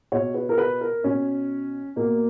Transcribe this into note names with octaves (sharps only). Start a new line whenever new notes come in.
B2 C#5
B4
A#4
B4
A#4
B2 C#4
B2 A#3